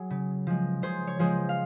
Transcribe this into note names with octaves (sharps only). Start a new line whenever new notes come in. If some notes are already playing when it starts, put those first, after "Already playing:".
Already playing: F#3 F#4 G#4
C#3
F3 G#3
C#3 G#4 C5
C#5
F3 G#3 G#4 C5
F5